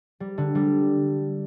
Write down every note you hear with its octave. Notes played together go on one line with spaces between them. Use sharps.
G3
D3
G3